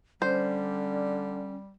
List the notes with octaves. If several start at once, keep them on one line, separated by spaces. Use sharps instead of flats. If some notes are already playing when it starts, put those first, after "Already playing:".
D3 G3 C#4 C5